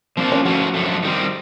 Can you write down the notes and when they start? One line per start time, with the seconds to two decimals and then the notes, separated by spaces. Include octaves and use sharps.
0.17 F3 A#3 C4 D4
0.32 C#4
0.45 F3 A3 C#4 F#4
0.74 F#2 D3 F3 A3
1.03 D#3 G3 C4